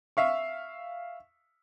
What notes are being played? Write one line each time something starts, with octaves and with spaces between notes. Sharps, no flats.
E5 F5 C#6